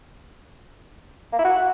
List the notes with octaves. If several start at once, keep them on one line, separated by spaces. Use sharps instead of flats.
A#3
E4
F#4